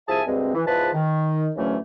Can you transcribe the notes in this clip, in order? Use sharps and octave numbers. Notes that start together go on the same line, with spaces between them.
C2 F3 G#4 E5 G#5 A5
D2 G2 G#3 C4
E3
E2 G#2 F3 F4 B4 A5
D#3
D2 C#3 E3 F#3 A3 C#4